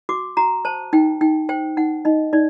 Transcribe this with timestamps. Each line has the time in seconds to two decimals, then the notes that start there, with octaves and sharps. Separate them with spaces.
0.09 F#4 D6
0.37 F#4 A#5
0.65 C5 A5
0.93 D#4 G5
1.21 D#4 G5
1.49 C5 G5
1.77 D#4 F#5
2.05 D#4 D#5
2.33 D#4 D5